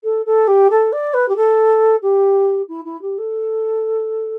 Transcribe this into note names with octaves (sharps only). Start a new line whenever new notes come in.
A4
A4
G4
A4
D5
B4
G4
A4
G4
E4
E4
G4
A4